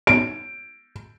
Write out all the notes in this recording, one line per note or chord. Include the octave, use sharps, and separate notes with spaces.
D7